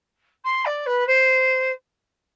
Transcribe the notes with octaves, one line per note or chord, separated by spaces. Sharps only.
C6
D5
B4
C5